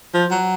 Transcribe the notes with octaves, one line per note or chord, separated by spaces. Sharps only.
F3
F#3